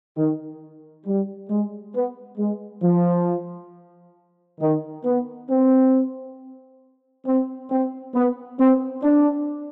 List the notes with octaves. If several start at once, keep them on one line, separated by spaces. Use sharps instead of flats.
D#3
G3
G#3
B3
G#3
F3
D#3
B3
C4
C4
C4
B3
C4
D4